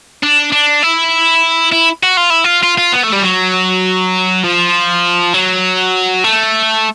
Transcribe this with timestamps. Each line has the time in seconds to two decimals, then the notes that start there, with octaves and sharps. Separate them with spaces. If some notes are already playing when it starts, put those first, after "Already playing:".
0.23 D4
0.52 D4
0.83 E4
1.72 E4
2.03 F#4
2.17 F4
2.30 E4
2.44 F4
2.63 F4
2.78 F4
2.93 B3
3.04 A3
3.13 G3
3.23 F#3
4.44 F3
5.34 F#3
6.24 A3